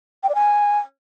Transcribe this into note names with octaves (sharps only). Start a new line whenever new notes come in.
G5
D5
G#5